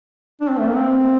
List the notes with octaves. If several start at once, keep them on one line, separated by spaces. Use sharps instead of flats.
D4
C4
A3
A#3
C4